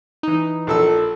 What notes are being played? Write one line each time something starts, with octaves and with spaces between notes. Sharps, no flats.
E3 D#4
A#1 A4 E6